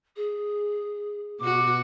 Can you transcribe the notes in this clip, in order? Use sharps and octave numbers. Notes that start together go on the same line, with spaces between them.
G#4
B2 F#4 D6